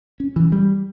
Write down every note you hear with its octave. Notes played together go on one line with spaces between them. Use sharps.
C#4
E3
G3